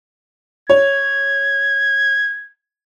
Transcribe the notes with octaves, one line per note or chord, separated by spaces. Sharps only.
C#5 G#6